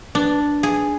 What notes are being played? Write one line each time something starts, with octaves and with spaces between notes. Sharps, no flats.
D4
G#4